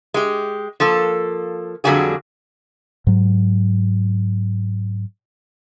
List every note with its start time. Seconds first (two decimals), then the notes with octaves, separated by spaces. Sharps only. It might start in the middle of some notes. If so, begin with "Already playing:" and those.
0.14 G#3 G4
0.80 F3 A#3 A4
1.84 F2 D3 F#3 G3 F#4 G#4
3.07 G#2 F#3